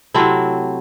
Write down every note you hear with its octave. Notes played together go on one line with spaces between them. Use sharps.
C3 F#3 A3 C4 E4